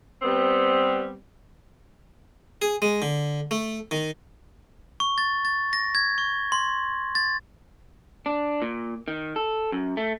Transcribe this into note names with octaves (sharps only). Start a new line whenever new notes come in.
G3 B3 C4
G#4
G#3
D3
A3
D#3
C#6
A6
A6
A#6
G#6
C#6
C6
A6
D4
A#2
D#3
A4
F#2
A3